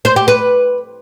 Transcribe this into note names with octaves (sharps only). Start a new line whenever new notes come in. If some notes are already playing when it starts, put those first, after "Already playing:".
C5
G4
B4